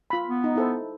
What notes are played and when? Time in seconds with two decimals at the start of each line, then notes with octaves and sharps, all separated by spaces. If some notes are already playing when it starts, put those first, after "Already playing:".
0.10 F4 B5
0.27 B3
0.44 D#4
0.56 E4 A4 C5